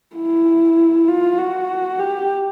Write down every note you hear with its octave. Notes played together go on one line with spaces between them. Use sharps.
E4
F4
F#4
G4